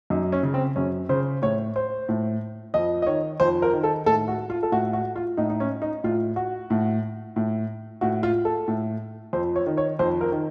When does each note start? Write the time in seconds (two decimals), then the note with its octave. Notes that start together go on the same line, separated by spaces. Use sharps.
0.10 F#2 D#4
0.32 C#4
0.43 C#3
0.54 C4
0.76 F#2 C#4
1.09 C#3 C5
1.42 A2 C#5
1.76 C5
2.09 A2
2.74 F2 D#5
3.02 D#5
3.07 D#3 C#5
3.40 F2 C5
3.62 A#4
3.73 D#3
3.83 A4
4.06 A2 A4
4.28 F#4
4.50 F4
4.63 A4
4.72 A2 F#4
4.93 F#4
5.16 F4
5.37 A2 D#4
5.50 D#4
5.60 C#4
5.82 D#4
6.04 A2 F4
6.36 F#4
6.70 A2
7.36 A2
8.01 A2 F#4
8.23 F4
8.45 A4
8.68 A2
9.33 F2 C5
9.56 C#5
9.67 D#3
9.77 C#5
9.99 F2 C5
10.21 A#4
10.32 D#3